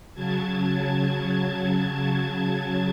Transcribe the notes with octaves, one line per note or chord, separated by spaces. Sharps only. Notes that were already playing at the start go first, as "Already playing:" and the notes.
C#3 F#3 A5 G#6